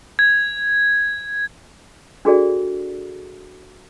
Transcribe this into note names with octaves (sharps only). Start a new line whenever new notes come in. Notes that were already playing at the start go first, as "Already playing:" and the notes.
G#6
D4 F#4 G#4 A4 D5